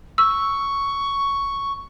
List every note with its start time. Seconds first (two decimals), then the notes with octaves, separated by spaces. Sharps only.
0.18 C#6 E6